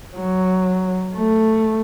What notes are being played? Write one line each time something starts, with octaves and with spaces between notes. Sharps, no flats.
F#3
A3